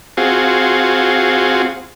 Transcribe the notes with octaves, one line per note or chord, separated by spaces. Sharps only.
C4 F4 F#4 G#4